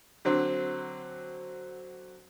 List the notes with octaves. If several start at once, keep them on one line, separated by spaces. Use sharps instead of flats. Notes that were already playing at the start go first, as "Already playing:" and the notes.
D3 F#3 C4